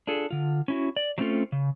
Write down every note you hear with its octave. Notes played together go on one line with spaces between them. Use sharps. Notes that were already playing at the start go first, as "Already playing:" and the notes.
D4 F4 G#4 A4
D3 F4
C#4 E4 F#4
D5
F#3 A3 C4 C#4 F4 A4
C#3